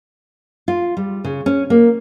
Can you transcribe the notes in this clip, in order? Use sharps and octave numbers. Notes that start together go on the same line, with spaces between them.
F4
G3
C#3
C#4
A#3